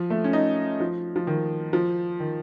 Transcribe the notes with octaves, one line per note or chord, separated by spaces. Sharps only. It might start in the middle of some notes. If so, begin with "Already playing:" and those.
Already playing: F3
A3
C#4
D#4
F3
F3
D#3
F3
D#3